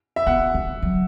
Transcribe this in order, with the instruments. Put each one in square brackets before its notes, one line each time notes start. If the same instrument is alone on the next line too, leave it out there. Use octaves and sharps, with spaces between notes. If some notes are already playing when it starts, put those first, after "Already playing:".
[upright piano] E5
[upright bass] B3 [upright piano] F#5
[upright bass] A3
F#3